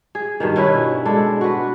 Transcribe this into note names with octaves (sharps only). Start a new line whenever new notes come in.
G#4
G2 B2 D#3
B2 C#4 E4 B4
G#3 D4 A4
F#4 B4